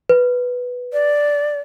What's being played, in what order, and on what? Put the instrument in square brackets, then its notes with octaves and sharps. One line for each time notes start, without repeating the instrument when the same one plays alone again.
[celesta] B4
[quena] D5